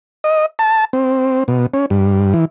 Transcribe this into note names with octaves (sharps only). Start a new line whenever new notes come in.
D#5
A5
C4
B2
C#4
G2
E3